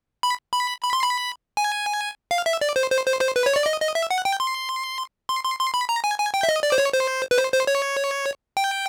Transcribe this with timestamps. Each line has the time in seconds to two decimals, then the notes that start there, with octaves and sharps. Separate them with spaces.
0.23 B5
0.53 B5
0.83 B5
0.93 C6
1.03 B5
1.57 G#5
2.31 F5
2.46 E5
2.61 D5
2.76 C5
2.90 C5
3.06 C5
3.21 C5
3.36 B4
3.46 C#5
3.56 D5
3.66 D#5
3.81 D#5
3.95 E5
4.11 F#5
4.25 G5
4.40 C6
5.29 C6
5.44 C6
5.59 C6
5.74 B5
5.89 A#5
6.04 G#5
6.19 G#5
6.34 G5
6.43 E5
6.49 D#5
6.63 D5
6.72 C5
6.78 C#5
6.93 C5
7.31 B4
7.37 C5
7.53 C5
7.67 C#5
8.57 G5